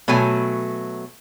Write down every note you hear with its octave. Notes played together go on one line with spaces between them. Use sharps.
B2 F#3 A3 G#5